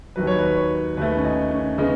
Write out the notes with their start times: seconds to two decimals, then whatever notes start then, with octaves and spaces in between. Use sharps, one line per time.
0.16 D#2 D#3 F#3 B4
0.27 C#5
0.38 B4
0.57 C#5
0.97 D#2 D#3 A3 B4
1.17 C#4
1.25 D#4
1.51 C#4
1.78 C#3 G#3 B3 D#4